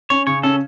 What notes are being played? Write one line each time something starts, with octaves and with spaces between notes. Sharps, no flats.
C#4 C#5
C#3 C#5
C#4 A4